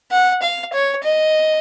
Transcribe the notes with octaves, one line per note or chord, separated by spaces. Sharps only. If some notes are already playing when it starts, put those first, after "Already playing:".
F#5
F5
C#5
D#5